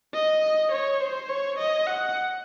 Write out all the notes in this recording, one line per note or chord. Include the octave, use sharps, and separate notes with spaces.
D#5
C#5
C5
C#5
D#5
F#5